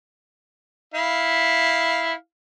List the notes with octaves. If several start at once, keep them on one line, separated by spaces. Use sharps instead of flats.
E4 F5